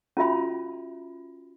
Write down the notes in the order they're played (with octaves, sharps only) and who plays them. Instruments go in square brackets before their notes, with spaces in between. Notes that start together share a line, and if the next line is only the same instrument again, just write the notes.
[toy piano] C#4 F4 F#4 E5 B5